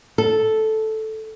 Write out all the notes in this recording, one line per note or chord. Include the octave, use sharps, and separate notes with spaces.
A4